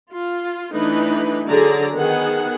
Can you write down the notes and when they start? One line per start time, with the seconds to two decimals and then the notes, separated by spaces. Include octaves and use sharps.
0.11 F4
0.73 E3 A3 D4 D#4 B4
1.48 D3 F#3 G#4 D5 A#5
1.94 D#3 B3 G#4 F#5